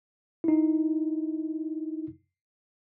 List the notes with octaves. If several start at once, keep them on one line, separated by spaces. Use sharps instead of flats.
D#4 E4